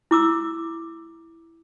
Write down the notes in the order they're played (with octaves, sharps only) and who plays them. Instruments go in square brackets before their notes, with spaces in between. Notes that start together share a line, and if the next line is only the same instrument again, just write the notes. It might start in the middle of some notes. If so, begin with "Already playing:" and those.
[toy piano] E4 D6 E6